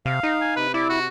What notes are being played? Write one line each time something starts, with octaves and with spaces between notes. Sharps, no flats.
C3 F5
D#4
G#5
C3 B4
E4 D5
F#4